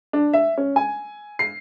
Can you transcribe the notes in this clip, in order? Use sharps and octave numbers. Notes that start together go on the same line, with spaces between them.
D4
E5
C#4
G#5
C7